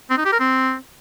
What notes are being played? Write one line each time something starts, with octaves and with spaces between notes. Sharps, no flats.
C4
D#4
G4
A#4
C4